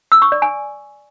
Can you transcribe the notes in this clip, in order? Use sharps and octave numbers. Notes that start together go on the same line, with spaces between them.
E6
C#6
D5
G#5